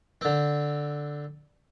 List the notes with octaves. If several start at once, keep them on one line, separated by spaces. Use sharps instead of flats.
D3 C4